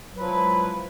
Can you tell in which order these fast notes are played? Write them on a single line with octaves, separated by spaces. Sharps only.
F#3 B4 F3 E4 G#3